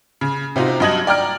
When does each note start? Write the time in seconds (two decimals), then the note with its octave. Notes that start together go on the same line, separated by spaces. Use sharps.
0.21 C#3
0.56 C3 C4 D#4 F4 F#4
0.80 G2 F#3 D#5 A5 G#6 F#7
1.07 D5 G5 A#5 F6 D7